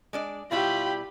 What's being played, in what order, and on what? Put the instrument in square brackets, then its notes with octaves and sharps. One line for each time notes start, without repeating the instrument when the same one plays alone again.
[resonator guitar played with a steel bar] G#3 D4 D5
[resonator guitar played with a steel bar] B2 G3 E4 [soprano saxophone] F4 [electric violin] G4 B5